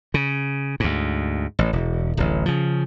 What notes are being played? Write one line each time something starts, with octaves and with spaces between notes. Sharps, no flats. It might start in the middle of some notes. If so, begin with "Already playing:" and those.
C#3
D2 G#2
A1
E1
D1 A1
C#3 F3